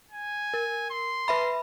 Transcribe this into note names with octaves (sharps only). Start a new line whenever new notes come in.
G#5
A#4
C6
B4 E5 B5